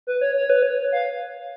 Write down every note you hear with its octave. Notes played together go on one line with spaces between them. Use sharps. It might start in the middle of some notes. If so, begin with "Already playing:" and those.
B4
C#5
C#5
B4
C#5
F5